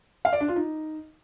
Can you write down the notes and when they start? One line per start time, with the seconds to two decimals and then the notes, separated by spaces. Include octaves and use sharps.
0.25 F5
0.33 D5
0.40 D4
0.48 F4
0.56 D#4